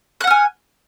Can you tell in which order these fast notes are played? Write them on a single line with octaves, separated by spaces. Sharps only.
F#6 F#5 F6 G#5